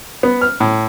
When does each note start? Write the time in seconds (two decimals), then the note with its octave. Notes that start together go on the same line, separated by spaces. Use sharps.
0.23 B3
0.42 F6
0.60 A2